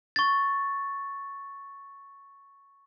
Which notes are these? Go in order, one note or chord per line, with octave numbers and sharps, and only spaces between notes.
C#6 A6